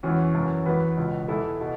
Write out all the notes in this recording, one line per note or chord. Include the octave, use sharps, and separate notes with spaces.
E2 E3 C#4 F#4
F#2 E3
E2 E3 F#4 B4
C#2 B2
E2 E3 E4 A4
B2